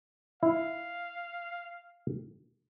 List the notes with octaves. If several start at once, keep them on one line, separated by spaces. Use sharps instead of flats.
E4 F5